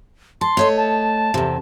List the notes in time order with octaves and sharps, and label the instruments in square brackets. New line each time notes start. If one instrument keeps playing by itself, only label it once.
[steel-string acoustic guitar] A5 [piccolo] C6
[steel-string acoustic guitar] A3 C#5 D#5
[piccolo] A5
[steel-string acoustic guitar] E2 C3